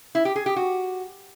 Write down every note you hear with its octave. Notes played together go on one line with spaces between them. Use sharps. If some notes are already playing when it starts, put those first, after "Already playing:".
E4
G4
G#4
G4
F#4